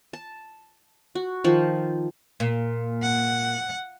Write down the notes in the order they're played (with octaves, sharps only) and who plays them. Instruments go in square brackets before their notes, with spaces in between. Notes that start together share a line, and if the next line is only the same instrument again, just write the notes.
[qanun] A5
F#4
D#3 F3
[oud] A#2
[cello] F#5